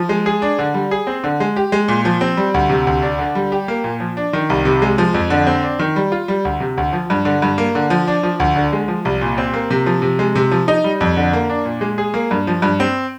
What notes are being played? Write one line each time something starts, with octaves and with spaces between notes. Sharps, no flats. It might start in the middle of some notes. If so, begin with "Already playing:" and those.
Already playing: F3
G#3
G#4
D4
D3
G3
G#4
C4
D3
G#3
G4
G#3
A#2
F3
C4
G3
D2
C3
D2
D4
D3
G3
G4
A#3
A#2
F3
D4
D#3
C2
C3
G#3
F3
F2
D3
C4
D4
D#3
G3
F4
G3
D2
C3
D2
F3
G2
D3
G2
A#3
D3
F3
D4
F3
D2
D3
G#3
F3
C2
A#2
C4
A#3
C3
F3
C3
G#3
C3
F3
D#4
G3
F2
D3
A#3
D4
A#2
G#3
G#4
A#3
G2
F3
G2
C4